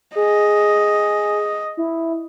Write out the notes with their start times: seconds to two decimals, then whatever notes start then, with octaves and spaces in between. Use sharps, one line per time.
0.16 G#4 D#5
1.77 E4